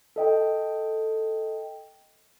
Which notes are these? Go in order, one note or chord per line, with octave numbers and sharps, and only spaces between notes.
A4 D#5 G5